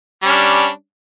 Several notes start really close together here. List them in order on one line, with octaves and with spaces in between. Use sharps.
G3 C#4 D4